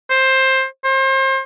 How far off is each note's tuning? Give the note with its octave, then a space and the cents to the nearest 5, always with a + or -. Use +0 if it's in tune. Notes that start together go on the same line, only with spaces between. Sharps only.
C5 +15
C5 +35